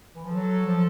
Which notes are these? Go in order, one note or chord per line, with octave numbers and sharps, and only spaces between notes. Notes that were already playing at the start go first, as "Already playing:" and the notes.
E3
F3
F#3 A4
F3